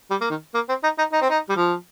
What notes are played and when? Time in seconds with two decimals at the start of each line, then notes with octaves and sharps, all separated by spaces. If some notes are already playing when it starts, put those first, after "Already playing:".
0.11 G3
0.21 A#3
0.30 D#3
0.55 A#3
0.69 C4
0.84 D#4
0.98 D#4
1.12 D#4
1.22 C4
1.30 D#4
1.49 G3
1.56 F3